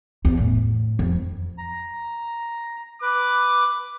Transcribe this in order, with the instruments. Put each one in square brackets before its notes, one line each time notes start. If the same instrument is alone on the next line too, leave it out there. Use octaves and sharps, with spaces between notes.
[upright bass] E2
A2
F2
[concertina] A#5
[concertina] B4 [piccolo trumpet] D6